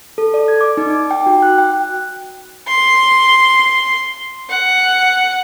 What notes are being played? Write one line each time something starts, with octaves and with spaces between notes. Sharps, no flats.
A4
D5
G#6
D6
D#4
D6
G5
F#4
F#6
G5
C6
F#5